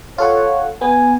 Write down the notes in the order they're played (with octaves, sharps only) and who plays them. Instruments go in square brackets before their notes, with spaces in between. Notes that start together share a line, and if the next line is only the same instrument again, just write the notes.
[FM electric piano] F4 A4 F#5 [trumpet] C#5
[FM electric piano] B3 [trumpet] G#5